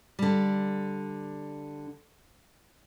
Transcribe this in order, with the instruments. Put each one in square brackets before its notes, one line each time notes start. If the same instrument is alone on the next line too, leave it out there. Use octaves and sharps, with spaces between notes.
[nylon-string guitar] D3 G3